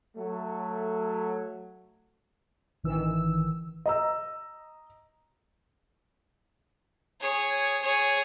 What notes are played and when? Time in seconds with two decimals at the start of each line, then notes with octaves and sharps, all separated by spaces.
0.16 F#3 A3
2.83 A1 D#3 E3 E6
3.86 D#5 A#5 E6
7.21 G#4 C#5
7.82 G#4 C#5